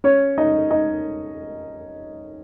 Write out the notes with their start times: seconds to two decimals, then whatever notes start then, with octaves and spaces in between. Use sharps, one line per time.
0.04 C#4 C#5
0.38 D#4 D#5
0.71 D#4 D#5